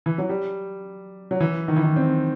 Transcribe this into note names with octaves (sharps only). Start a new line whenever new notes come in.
E3
F#3
G3
F#3
E3
D#3
E3
D#3
C4